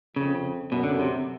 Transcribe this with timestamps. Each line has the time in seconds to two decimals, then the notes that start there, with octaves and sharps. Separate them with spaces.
0.16 F2 C#3
0.72 F#2 B2
0.83 D3
0.91 C#3
1.00 C3